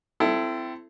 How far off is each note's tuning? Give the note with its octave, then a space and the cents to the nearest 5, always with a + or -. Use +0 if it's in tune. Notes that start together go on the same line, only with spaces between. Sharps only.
C4 -15 E4 +20 A4 +0